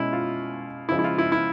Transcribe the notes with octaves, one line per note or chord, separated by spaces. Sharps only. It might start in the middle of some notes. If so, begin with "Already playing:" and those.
Already playing: B2 G#3 C#4 E4
F4
C#3 F3 G#3 E4
E4
F4
E4
E4